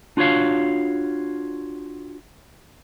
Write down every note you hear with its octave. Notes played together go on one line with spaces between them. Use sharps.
D4 F4 F#4 C#5 F5